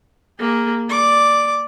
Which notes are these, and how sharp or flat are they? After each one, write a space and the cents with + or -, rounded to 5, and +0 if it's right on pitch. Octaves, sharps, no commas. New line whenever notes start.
A#3 +0 G#4 -25
D5 +0 D6 +0